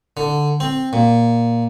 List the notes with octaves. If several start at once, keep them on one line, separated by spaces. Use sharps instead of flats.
D3
C4
A#2